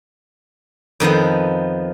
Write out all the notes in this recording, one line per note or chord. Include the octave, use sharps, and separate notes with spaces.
F2 D#3 F3 B3